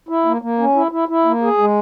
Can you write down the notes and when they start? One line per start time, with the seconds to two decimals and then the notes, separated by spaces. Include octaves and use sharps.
0.09 E4
0.25 A#3
0.42 A#3
0.59 C#4
0.75 E4
0.91 E4
1.08 E4
1.25 A#3
1.42 G#4
1.58 G#3